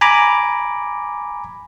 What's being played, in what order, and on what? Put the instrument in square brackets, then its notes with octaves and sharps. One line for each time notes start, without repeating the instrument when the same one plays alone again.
[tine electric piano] G#5 A#5 B5 D6